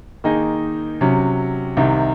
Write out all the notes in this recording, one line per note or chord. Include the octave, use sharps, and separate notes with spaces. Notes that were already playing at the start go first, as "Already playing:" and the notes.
D#3 A#3 D#4 G#4
C3 F#3 C#4
C2 C3 D#3